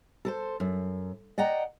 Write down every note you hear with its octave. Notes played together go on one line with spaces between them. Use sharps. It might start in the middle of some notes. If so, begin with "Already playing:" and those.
A4 A#4 C5
F#2
D5 D#5 F#5 G5 A#5